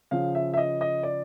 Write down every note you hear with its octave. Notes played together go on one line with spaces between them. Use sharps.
C#3 F3 F5
E5
E5
D#5
D#5
D5